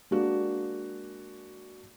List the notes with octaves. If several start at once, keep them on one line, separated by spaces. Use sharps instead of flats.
G#3 A#3 D4 F#4